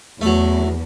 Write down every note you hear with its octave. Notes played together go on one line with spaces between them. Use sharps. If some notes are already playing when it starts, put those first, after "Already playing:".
E2 F#3 A3